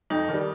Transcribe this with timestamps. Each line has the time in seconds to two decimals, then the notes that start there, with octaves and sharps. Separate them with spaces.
0.10 F2 D#4
0.29 D#3 G3